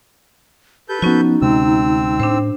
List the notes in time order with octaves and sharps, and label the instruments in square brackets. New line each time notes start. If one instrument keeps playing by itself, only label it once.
[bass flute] G4 [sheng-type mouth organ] A4 B4 G6
[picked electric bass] F3 B3 [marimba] C#4 F#4 [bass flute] D#4
[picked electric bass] D2 C3 G#3 [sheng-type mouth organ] C4 E6
[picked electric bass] A2 [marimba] D4 C5